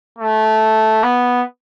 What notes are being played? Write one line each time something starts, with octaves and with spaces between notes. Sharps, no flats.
A3
B3